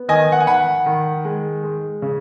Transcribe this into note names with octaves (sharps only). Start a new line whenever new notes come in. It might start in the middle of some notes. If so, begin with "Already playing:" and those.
Already playing: B3
D#3 D#5 G#5
F#5
G#5
D#3 F#5 B5
D#3
G#3
G#3
C#3